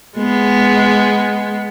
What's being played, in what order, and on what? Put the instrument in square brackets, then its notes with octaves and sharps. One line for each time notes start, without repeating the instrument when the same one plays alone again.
[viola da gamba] G#3 B3